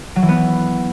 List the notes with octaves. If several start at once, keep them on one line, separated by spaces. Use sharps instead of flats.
F#3
E3
B3